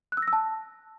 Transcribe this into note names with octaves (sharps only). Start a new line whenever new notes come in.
F#6
E6
A#6
E6
A5